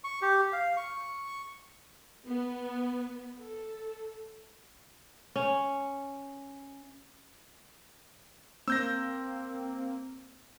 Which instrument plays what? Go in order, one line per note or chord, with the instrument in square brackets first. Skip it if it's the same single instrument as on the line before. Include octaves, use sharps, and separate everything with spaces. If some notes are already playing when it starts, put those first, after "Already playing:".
[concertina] C#6
G4
F5
C#6
[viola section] B3
A4
[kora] C#4
[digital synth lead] A#3 [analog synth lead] C4 [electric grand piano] E6 G6 A#6